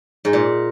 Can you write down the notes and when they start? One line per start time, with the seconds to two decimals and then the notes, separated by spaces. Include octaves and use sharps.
0.25 G#2
0.33 A#2